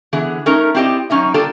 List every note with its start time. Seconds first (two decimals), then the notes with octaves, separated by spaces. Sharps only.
0.13 D3 E3 B3 G#4
0.46 A3 C#4 D#4 A#4
0.75 C4 E4 G4 D5 D#5
1.10 F#2 G#3 C#4 D#4 E5
1.34 A#3 D4 F4 G4 A4